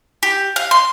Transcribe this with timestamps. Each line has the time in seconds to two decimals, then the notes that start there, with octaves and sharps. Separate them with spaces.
0.23 G4
0.56 F5
0.71 C6